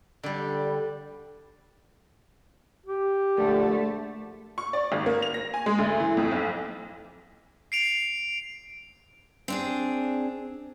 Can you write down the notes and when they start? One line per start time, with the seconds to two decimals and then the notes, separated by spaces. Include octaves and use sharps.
0.23 D3 G3
2.86 G4
3.37 A#1 D3 A3
4.58 C#6
4.73 D5
4.92 G#1
5.06 A#3
5.22 F7
5.34 A#6
5.54 G#5
5.66 G#3
5.78 D2
6.00 E3
6.17 F2
6.32 B1
7.72 C7 D7 F7
9.48 C4 D4 G#4